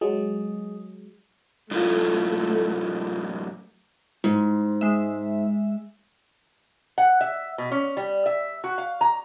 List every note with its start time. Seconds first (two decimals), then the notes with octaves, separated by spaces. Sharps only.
0.01 F#3 G#3 G#4
1.71 F#2 A2 A3 D4 F4
4.24 G#2
4.81 G#3 E5
6.98 F#5
7.21 E5
7.58 B2
7.72 C#4
7.97 G3
8.26 E5
8.64 F#4
8.78 F5
9.01 A#5